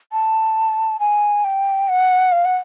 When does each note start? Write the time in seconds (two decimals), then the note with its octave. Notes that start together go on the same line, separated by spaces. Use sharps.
0.12 A5
1.00 G#5
1.44 G5
1.88 F#5
2.32 F5
2.45 F#5